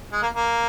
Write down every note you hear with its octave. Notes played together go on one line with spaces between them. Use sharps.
G#3
A#3
A#3